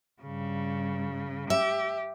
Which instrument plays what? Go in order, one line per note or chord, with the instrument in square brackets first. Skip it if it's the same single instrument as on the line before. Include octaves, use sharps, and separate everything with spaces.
[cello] G2 C#3
[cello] G4 [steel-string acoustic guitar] E5